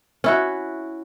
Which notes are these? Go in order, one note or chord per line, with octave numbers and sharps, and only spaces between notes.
C#4 E4 F#4